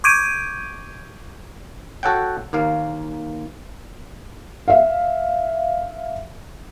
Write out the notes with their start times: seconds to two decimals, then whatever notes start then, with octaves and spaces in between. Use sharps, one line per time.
0.04 C#6 D6 G6 G#6 D7 D#7
2.03 F#4 A4 C#5 F#5 G5
2.53 D#2 A#3 F5
4.68 E5 F5